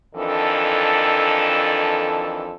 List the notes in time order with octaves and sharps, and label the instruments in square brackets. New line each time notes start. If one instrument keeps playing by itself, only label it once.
[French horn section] F2 D#3 E3 D4 A4